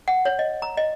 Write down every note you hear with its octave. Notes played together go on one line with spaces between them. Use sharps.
F#5
C#5
D#5
A#5
D#5